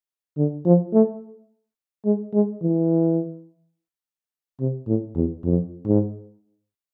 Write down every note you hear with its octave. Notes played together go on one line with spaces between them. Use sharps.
D3
F3
A3
G#3
G#3
E3
C3
A2
E2
F2
G#2